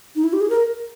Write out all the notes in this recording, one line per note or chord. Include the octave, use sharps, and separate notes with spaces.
D#4
E4
G4
G#4
A#4